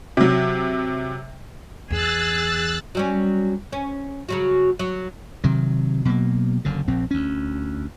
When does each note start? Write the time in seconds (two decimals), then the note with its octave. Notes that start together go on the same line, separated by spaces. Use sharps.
0.17 C3 F#3
1.91 E2 G#4 E6 F#6 A6
2.95 F#3 G3 C#4
3.73 C#4
4.29 C#3 F#3 F#4
4.79 F#3
5.44 C3 D#3 F#3
6.05 B2 F#3 G3 A#3
6.65 F#1 F#2 D3
6.88 A#1 C4
7.11 D2 C#4